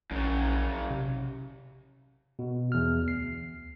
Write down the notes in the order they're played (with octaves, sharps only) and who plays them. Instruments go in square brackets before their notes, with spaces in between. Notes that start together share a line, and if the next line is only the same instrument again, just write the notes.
[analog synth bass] A#1 [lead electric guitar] F#2 C#3
[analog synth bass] C3
[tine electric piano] B2
E2 F6
D2 C7